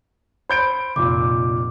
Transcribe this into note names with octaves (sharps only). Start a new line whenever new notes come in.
C5 B5 G6 D7
F1 A#2 D6